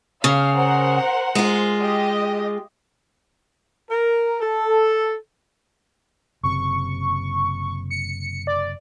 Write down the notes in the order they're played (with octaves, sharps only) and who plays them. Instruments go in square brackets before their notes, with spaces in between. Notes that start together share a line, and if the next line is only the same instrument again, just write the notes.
[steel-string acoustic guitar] C#3 [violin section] F5
[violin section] A#4 C5 F#5
[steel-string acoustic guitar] G#3 F4
[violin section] G4 D#5
[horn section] A#4
A4
[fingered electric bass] F#1 C3 [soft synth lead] C#6
[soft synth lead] C#7
D5